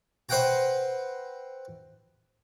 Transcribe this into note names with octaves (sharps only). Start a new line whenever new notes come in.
B4 C5 E5 F#5 G5 A#5